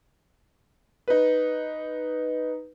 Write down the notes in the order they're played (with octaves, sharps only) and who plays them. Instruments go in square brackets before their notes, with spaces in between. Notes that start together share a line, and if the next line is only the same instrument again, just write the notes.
[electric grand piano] D#4 B4